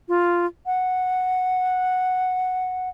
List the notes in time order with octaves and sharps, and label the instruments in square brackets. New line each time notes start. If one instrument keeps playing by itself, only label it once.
[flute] F4
F#5